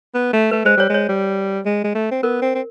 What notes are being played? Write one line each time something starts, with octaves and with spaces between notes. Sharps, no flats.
B3
A3
A3 B4
G#3 C5
G3 C#5
G#3 C#5
G3
G#3
G#3
A3
C4
B3 A#4
C4
C4